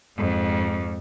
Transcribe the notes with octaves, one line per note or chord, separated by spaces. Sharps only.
F2 G#2